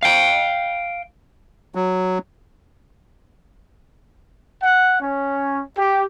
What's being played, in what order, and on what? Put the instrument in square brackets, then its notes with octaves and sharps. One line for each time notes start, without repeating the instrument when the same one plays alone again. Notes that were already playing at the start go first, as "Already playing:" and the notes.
[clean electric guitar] F5 G5
[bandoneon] F#3
[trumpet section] F#5
C#4
G4